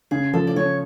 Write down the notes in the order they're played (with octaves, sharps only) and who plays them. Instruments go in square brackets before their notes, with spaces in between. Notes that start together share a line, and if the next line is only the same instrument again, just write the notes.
[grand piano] C#3 [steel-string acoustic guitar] G#4
[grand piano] F3 [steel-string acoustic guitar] A4
[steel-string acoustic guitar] D5
[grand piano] C#3 [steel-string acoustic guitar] C#5